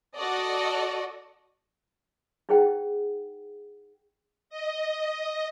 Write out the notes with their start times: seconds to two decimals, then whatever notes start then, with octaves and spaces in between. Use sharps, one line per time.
0.17 F#4 A4 D5 D#5
2.49 D#4 E4 G#4 C5 F#5 G5
4.50 D#5